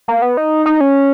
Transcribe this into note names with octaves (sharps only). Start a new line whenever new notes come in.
A#3
B3
D#4
D#4
C#4